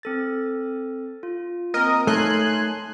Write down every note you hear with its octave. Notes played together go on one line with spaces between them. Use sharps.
C4 A4 A6
F4
A#3 C4 A#4 D#5
A3 D#4 C#5 G#5 A5 C6 F#6